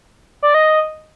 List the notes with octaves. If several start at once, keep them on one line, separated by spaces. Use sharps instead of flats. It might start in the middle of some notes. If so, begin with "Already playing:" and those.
D5
D#5